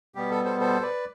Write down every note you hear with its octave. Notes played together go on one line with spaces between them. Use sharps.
B2 G3 B3 G4
A4
A4 C5
A4 C5
B4 D5